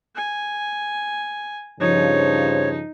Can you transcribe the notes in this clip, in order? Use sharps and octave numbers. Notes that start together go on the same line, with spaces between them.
G#5
G2 C#3 F3 D#4 C#5